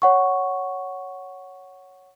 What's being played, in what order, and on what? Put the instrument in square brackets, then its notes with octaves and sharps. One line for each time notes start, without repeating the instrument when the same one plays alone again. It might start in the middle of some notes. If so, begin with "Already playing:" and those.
[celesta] C#5 F#5 C#6